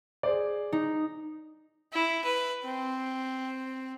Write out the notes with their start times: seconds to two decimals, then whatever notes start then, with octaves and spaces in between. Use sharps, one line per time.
0.23 G#4 C5 D5
0.73 D#4
1.93 E4
2.24 B4
2.64 C4